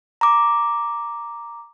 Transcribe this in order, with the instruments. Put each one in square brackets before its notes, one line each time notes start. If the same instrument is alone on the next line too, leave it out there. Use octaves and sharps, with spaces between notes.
[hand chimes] A#5 D6